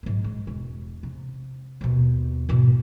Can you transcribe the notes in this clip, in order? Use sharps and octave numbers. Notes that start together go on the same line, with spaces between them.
G#2 F#3
G#3
E1
C3
D#2 B2
G#2 B2